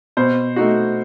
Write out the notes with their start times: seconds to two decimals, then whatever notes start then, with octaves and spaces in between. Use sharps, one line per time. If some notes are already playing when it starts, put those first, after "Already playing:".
0.17 B2 C5
0.56 A3 D#4 F#4